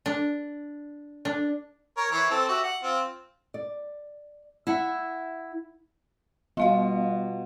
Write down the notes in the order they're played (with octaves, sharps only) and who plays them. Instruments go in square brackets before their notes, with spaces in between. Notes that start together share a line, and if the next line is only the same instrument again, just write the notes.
[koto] D4
D4
[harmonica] A#4 C#5
E3 C#5 C#6
C4 A4
F#4 G4 E5
F#5
C4 F4
[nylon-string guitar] D5
E4 E5 F#5
[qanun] B2 F4 [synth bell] G3 F5